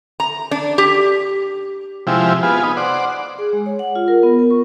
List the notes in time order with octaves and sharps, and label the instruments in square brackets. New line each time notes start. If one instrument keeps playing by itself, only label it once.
[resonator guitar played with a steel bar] A#5
D4
G4
[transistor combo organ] C3 F3 G#3 E4 G4
B3 F4 G#4
B3 D#4
C5 D5 F#5
[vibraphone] G#4
G#3
C#5
F#5
F4
A#4
B3
A#4
C#6